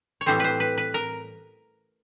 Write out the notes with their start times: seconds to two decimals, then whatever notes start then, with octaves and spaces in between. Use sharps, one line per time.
0.21 C#5
0.26 A2 E3 G3 C4 C5
0.40 B4 C5
0.60 B4
0.78 B4
0.94 A#4